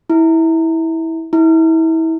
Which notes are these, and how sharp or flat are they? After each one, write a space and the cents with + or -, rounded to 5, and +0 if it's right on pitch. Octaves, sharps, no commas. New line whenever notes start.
E4 -20
E4 -30